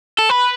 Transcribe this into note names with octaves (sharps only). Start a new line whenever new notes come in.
A4
B4